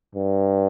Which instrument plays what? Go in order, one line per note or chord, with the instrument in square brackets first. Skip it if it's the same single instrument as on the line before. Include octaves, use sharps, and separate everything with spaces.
[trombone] G2